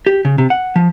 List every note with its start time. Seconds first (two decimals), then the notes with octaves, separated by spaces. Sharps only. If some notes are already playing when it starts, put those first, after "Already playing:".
0.06 G4
0.25 C#3
0.38 C3
0.50 F#5
0.76 F3